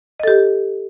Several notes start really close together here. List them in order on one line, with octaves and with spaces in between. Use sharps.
D#5 A4 G4